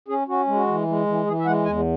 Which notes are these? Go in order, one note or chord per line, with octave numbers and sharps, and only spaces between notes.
C#4 G#4
C#4 F#4
G#3
F#4
E3
G#3
E3
E3 G#4
E5
G#3 F#5
E2 G#5